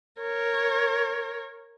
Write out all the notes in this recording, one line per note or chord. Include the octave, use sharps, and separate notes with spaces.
A#4 C#5